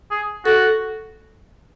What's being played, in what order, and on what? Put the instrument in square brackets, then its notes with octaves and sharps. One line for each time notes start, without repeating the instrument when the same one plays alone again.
[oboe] G#4
[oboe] F#4 [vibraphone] A4